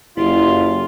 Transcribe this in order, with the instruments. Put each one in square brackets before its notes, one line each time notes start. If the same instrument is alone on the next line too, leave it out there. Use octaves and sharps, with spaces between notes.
[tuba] F#1 [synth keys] E4 G4 [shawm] F4